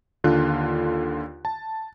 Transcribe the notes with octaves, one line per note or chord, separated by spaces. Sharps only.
D#2 D3 F4 F#6
A5